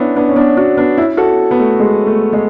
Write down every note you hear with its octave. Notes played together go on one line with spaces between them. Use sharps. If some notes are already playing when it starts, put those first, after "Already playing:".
Already playing: B3 C#4 D4 E4
B3 D4
C#4
B3 D4
D4 F#4
B3 D4
C#4 E4
F#4 A4
B3
A3
G#3
A3
G#3